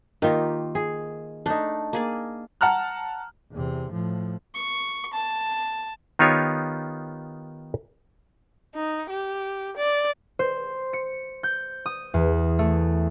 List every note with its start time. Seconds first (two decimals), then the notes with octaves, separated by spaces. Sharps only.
0.22 D#3 A#3 D#4 F4 G4
0.75 G#4
1.46 A3 D4 D#4
1.93 A#3 G#4 D5
2.61 F#5 A5 A#5 F6 F#6
3.52 E2 C3
3.91 A2 F3
4.54 C#6
5.13 A5
6.19 D#3 B3 D#4 F4 G4 C#5
8.75 D#4
9.10 G4
9.76 D5
10.39 C5
10.93 C#7
11.43 G6
11.86 D#6
12.14 E2
12.59 A3